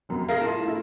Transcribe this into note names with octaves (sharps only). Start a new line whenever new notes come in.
F1 F#2 B2
G#4 A#4 E5 F5 A#6
A2 F4 A5
A3 E4